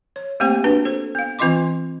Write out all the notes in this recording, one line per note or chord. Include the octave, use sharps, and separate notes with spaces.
C#5
A3 A#3 C4 G4 C5 G5
D4 F#4 B4 A5
A4 C5
B3 F5
E3 C4 F4 D#5 C6 D6